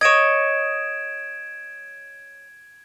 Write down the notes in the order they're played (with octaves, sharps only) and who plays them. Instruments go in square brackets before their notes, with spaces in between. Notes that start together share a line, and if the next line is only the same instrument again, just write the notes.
[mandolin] C#5 D#5 [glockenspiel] G#6 D7 E7